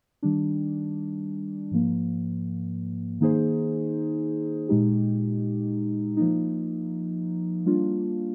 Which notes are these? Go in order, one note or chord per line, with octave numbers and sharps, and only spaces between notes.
D#3 G3 D4
G#2 F3 A#3
D#3 A#3 D#4 G#4 C5
A#2 G#3 D#4 G4
F3 A#3 D#4
G3 A#3 D4 F4